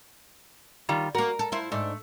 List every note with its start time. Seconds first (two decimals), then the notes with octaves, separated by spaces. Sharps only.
0.89 D#3 G3 F4
1.15 A#3 F#4 A#4
1.39 A4
1.52 E4 F4 C5
1.72 G#2 A3 D4